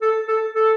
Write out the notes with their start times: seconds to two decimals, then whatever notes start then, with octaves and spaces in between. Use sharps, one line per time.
0.02 A4
0.28 A4
0.54 A4